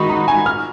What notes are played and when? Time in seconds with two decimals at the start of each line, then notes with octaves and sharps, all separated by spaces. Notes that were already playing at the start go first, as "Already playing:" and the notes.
Already playing: D#3 G#3 D#4 F#4 B5 C#6
0.09 A#5
0.28 G#5
0.46 F6